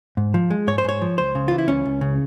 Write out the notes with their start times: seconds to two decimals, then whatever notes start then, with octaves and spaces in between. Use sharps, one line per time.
0.17 G#2
0.34 F3
0.50 G#3
0.67 G#2 C#5
0.78 C5
0.84 G#2 C#5
1.01 F3
1.18 C#2 C5
1.35 C#3
1.48 E3 F4
1.58 E4
1.68 C#2 C#4
1.85 C#2
2.01 C#3